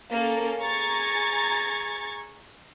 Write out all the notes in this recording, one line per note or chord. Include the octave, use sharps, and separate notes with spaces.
A#3 C#4 A4
G#4 A#5 C#6 G#6 A6